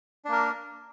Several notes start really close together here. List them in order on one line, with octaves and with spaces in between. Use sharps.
D4 A#3 A#4